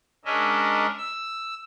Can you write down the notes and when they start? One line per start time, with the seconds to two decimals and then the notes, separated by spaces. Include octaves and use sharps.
0.25 G#3 C#4 D4 A#4 D#5 E5
0.98 E6